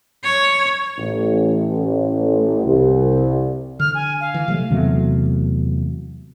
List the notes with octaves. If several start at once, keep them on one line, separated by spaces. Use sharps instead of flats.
C#5
A1
C2
D3 F6
G#5
F5
E3
C3 F#3 A3
E2 C3 F#3 A3